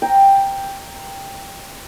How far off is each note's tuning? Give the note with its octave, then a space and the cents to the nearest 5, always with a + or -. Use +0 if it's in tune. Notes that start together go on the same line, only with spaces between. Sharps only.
G5 +5 A#5 +0